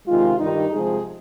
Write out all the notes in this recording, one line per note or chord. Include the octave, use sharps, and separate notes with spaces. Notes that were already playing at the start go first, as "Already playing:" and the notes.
C3 D#3 G#3 F4
G2 D#3 G3 D#4
C3 F3 G#3 G#4